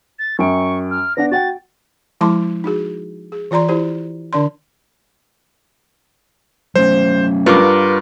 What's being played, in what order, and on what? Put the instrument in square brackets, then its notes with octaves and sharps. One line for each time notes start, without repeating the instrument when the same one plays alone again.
[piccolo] A6
[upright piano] F#2 G5 D7 [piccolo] C#6
[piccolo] F6
[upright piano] B3 D4 F#5 [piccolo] A#6
[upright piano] F#4 F#5 G5 [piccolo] A6
[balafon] F3 G#3 E4 A5 C6 D6
D#4 F#4 G#4
G#4
E3 F4 D5 A#5 C6
E4 G4 C5
D3 D4 D5 C6
[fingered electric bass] F#3 A3 C#4 [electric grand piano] C5
[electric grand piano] G2 [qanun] F4 A#4 F#5 [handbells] B4 D6